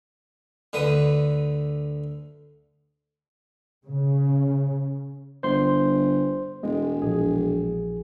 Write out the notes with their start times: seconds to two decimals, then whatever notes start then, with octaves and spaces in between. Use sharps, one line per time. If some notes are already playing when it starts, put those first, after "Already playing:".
0.73 D2 D3 B4 D#6
3.87 C#3
5.43 G1 C5 C6
6.63 E1 G#3
7.02 A#1 G#4